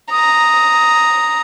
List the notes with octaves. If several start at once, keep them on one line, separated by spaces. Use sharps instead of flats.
A#5 D#6